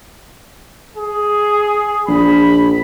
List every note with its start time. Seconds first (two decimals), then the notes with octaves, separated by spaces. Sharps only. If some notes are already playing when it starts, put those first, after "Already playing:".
0.97 G#4
2.08 A#1 B5